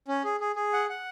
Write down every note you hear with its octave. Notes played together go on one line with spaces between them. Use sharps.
C#4
G#4
G#4
G#4
F#5
F#5